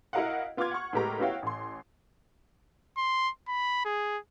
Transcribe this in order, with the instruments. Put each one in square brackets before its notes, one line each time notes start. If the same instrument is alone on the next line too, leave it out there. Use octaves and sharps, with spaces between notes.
[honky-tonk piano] E4 F#4 A#4 D#5 F5 F#5
B3 F4 C6 D6 F6 G#6
F#5 C#6
A2 G#3 B3 G4 A#4 A#5
B3 E4 F#4 C#5 F5 G5
A1 C6
[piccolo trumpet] C6
B5
G#4